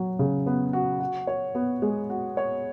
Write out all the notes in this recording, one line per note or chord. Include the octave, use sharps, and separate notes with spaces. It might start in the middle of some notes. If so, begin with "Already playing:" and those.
Already playing: F#3 F#4
C#3
B3
F#4
F#4
C#5
B3
G#3
F#4
C#5